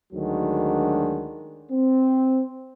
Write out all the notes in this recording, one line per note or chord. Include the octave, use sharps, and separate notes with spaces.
D2 D#3 F#3 G#3 D4 F#4
C4